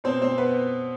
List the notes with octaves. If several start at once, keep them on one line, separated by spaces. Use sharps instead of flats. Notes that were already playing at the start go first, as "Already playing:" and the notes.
B2 C4 C5
C4 C5
B3 B4